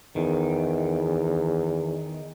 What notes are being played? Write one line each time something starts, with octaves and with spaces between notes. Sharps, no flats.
E2 D#3